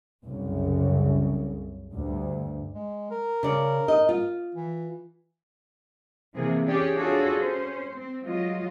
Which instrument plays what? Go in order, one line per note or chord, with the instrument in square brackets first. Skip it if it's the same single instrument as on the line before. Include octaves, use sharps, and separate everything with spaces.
[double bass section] C2 F#2 C#3
D2 G2
[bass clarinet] G#3
A#4
[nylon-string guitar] C#3 D5
D#4 D#5
F4
[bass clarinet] E3
[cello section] C3 E3 A#3 G#4
C#4 G4 G#4 C#5 D5
D4 F4 F#4 G#4 A4 C#5
C#4 C5
C4
F#3 G#3 F4 D#5